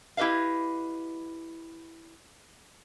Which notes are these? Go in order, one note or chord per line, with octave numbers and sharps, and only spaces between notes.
E4 G4 B4 D#5 F5